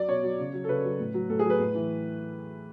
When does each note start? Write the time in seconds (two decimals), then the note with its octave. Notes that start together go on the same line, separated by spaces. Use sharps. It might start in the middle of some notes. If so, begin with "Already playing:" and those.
Already playing: F#3 D5
0.08 B2 C#5
0.23 F#3
0.39 C#3
0.54 F#3
0.64 A4
0.69 C#3 B4
0.84 F#3
1.00 A2
1.14 F#3
1.29 A2 A4
1.39 G#4
1.45 F#3 B4
1.60 A2
1.75 E3